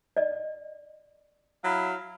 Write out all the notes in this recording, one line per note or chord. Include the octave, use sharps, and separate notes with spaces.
D5 D#5
F#3 E4 F5